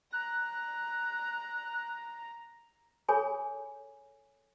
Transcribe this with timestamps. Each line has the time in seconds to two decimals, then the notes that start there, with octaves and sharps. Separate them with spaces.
0.13 A#5 F#6
3.08 G#4 A4 C#5 G#5 B5